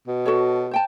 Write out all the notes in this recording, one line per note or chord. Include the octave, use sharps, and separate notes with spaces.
B2
F#4 A4 C#5
C5 G5 A5